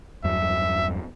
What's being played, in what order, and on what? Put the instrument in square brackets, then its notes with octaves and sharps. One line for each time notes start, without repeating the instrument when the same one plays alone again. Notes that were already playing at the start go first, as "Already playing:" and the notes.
[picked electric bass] E2 G2 F#3 [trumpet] E5